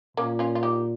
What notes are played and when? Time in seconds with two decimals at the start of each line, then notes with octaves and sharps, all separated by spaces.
0.17 A#2 A#3 C#4
0.39 C#4 F4
0.55 F4
0.63 D#4 G4